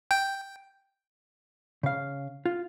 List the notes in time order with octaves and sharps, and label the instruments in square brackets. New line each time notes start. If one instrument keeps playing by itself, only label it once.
[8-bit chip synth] G5
[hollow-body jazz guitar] C#3 F5
F4